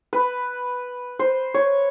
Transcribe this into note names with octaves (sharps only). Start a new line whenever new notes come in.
B4
C5
C#5